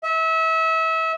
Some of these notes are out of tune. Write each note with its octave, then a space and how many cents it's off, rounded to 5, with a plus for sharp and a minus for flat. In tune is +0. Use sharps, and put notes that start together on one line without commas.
E5 -30